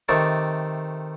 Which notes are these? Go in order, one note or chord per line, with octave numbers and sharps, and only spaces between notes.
C3 D#3 A3 D5 C#6